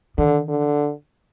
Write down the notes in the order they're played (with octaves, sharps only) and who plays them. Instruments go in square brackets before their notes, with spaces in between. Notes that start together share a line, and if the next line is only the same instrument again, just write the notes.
[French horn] D3 [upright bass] D#3
[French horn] D3